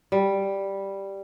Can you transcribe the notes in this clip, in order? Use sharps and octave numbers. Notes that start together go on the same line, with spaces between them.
G3